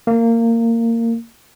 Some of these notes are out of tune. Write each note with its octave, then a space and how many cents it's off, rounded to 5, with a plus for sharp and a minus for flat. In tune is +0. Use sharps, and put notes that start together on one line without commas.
A#3 -20